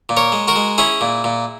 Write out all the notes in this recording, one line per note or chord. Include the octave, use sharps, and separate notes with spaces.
A#2
A#4 C#5
G#3
F#4 A#4
G#3
C#4 E4 G#4
A#2
A#2